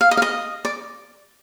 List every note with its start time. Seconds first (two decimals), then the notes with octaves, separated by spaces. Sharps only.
0.01 F5
0.11 D#5
0.17 F5
0.22 D#5
0.65 D5